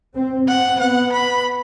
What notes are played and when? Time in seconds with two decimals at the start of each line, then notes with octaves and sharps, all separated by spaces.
0.15 C4
0.48 C4 F#5
0.80 B3 F#5
1.12 B5